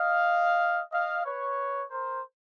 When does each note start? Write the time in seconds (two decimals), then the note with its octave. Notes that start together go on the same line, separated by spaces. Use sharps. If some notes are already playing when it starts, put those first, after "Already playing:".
Already playing: D#5 F5
0.92 D#5 F5
1.24 B4 C#5
1.90 A#4 C5